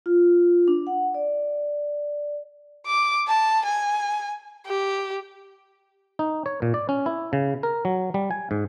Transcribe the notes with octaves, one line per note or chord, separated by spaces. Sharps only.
F4
D4
F#5
D5
D6
A5
G#5
G4
D#4
C#5
A#2
D5
C#4
E4
C#3
A#4
F#3
G3
G#5
G#2